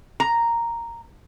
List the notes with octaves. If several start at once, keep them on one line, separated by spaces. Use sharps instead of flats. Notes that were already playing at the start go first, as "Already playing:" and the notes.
A#5